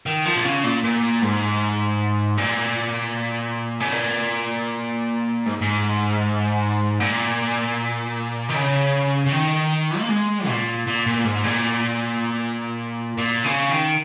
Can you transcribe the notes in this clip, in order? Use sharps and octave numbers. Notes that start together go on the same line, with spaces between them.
D#3
F3
A#2
C#3
A#2
A#2
G#2
A#2
C#3
A#2
G#2
G#2
A#2
D#3
C#3
C#3
D#3
A#3
G#3
A#2
A#2
A#2
G#2
A#2
A#2
C#3
D#3